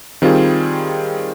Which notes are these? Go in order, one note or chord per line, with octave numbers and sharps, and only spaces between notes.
D#3 G3 C4 F4 G#4